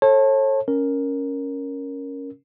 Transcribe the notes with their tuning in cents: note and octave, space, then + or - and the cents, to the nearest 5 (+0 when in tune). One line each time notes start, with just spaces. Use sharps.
A4 +0 C#5 -35 A5 +0
C#4 +0 A#4 +0